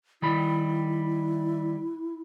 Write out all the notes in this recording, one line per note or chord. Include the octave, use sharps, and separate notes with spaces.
D#3 G3 E4 B5